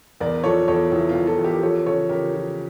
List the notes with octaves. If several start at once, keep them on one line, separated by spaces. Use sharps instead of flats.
E2 A#4 D5
F3 A4 C#5
E2 A4 C#5
E2 E4
F4
E2
F4 A4
E2
G4 A#4
F3 A4 C#5
C#3 A4 C#5
C#3 G4 A#4
F3